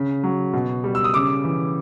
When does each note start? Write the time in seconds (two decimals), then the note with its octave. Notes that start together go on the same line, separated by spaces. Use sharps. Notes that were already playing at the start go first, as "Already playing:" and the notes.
Already playing: C#3
0.24 F#3
0.53 B2
0.84 G3
0.95 E6
1.04 D#6
1.14 C#3 D6
1.44 E3